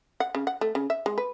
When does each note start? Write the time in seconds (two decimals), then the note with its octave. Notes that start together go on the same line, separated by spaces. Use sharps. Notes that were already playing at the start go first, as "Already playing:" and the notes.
0.20 F#5
0.35 C#3
0.47 F#5
0.61 A3
0.75 C#3
0.90 E5
1.06 G#3
1.18 B4